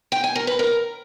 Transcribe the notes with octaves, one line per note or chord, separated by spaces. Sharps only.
G5
G#5
A#4
B4
A#4